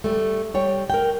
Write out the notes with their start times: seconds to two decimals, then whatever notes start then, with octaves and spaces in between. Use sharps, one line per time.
0.04 G3 A3
0.54 G3 C#5 G5
0.90 A#4 G5